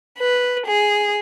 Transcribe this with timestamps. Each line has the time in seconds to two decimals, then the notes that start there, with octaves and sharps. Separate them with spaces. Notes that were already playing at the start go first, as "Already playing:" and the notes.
0.20 B4
0.67 G#4